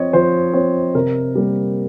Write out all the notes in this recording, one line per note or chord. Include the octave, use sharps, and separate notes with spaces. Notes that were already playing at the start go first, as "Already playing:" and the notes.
Already playing: F3 C4 C#5 D#5
F3 C5
C4 C#5
C3 A#4
G3 A#3